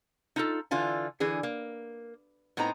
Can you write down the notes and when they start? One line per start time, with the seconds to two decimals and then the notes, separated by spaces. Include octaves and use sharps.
0.36 D#4 F4 A4
0.71 D3 E3 F4 G#5
1.20 D3 E3 G#4
1.43 A#3
2.57 A2 B3 C4 D#4 A#5